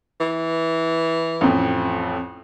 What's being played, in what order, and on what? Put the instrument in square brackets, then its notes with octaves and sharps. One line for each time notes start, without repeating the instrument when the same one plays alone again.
[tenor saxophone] E3
[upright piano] A1 F2